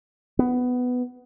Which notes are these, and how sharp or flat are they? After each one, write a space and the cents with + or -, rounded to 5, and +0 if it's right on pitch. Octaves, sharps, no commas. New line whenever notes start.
B3 +10